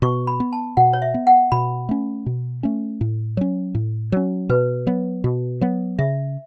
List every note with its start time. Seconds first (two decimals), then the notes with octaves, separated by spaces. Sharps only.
0.02 B2 C#6
0.27 B5
0.40 B3
0.53 A5
0.77 B2 F#5
0.93 C#5
1.02 E5
1.14 B3
1.27 F#5
1.52 B2 B5
1.89 A3 C#4
2.26 B2
2.63 A3 C#4
3.01 A2
3.37 F#3 C#4
3.75 A2
4.12 F#3 C#4
4.49 B2 B4
4.87 F#3 B3
5.24 B2
5.61 F#3 B3
5.99 C#3 E5